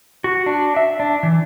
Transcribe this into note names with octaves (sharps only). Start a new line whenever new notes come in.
F#4
D4
E5
D4
E3